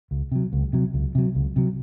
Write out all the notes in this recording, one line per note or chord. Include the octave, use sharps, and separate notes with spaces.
C#2
C3 F#3
C#2
C3 F#3
C#2
C3 F#3
C#2
C3 F#3